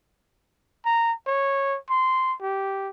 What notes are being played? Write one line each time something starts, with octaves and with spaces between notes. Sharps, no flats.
A#5
C#5
C6
G4